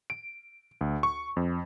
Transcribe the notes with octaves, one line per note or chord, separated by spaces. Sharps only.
D7
D2
C#6
F2